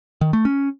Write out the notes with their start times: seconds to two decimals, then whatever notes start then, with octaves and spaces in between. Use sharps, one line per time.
0.21 D#3
0.33 A3
0.45 C#4